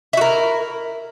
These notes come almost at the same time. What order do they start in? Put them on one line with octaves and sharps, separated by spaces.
E4 F#4 A#4